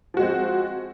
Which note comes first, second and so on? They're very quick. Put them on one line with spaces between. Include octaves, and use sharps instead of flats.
F3 F#4 G#3 C4